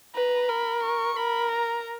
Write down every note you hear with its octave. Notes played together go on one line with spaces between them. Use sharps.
B4 A#5
A#4 B5
C#6
A#4 B5
A#5